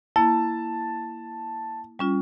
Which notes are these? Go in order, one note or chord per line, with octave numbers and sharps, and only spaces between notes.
A#3 E4 A5
G3 C#4 F4